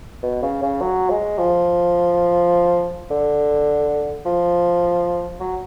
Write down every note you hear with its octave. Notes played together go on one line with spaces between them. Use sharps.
B2
C#3
C#3
F#3
G#3
F3
D3
F3
F#3